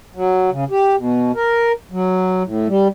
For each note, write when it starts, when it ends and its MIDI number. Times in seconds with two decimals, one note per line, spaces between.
0.15 0.50 54
0.51 0.64 49
0.70 0.96 67
0.97 1.32 47
1.35 1.72 70
1.92 2.43 54
2.45 2.68 45
2.68 2.88 55